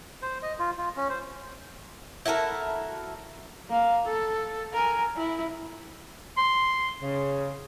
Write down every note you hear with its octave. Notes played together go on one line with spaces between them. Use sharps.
C5
D#5
F4
F4
C#4
C5
E4 F#4 A4 A#4
A#3 F5
A4
A#4 G#5
E4
C6
C#3